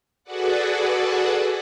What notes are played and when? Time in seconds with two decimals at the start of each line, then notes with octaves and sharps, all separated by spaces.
0.24 F#4 G#4 A4 B4 D5 F#5